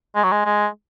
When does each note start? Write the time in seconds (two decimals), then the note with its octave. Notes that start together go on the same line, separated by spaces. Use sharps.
0.15 G#3
0.23 F#3
0.32 G#3
0.45 G#3